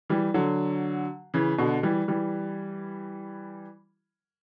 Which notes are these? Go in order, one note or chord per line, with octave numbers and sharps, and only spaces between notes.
E3 G3
D3 F#3
C#3 E3
B2 D3
E3 G3
E3 G3